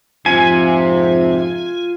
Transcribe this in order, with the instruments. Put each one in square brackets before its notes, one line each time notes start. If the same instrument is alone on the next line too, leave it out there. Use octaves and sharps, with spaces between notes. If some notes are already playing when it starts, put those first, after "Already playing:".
[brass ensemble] F2 G#2 F3 [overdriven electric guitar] C3 [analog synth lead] F4 [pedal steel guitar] G#5